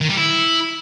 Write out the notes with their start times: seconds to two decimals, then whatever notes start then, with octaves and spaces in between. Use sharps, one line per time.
0.01 D#3
0.09 G3
0.17 E4